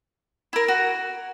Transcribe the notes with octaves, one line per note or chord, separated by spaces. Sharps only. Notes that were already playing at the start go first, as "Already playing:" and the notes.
E4 A#4
F#4